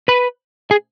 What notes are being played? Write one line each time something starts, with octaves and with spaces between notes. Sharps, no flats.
B4 B5
G#4 G#5